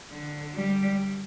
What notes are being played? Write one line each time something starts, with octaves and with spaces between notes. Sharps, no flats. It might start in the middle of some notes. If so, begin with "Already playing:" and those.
D3
G3